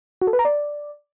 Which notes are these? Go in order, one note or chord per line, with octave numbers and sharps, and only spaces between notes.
F#4
A4
B4
A#5
D5